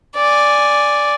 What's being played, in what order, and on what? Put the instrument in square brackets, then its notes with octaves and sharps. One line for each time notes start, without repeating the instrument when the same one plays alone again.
[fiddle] D5 G#5